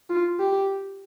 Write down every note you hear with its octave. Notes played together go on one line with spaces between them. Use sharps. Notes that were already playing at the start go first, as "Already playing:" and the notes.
F4
G4